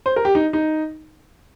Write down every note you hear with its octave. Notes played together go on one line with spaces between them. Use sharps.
C5
A#4
G4
D#4
D#4